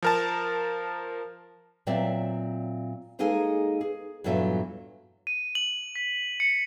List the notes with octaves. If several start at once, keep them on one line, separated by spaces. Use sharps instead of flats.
F3 A#4 A5
A#2 F#3 C4 C#5 D5 E5
G#3 A#3 D#4 G#4 A4 G#5
G#4
E2 G2 A#2 F#3 A4 E5
D#7
F#7
B6
C#7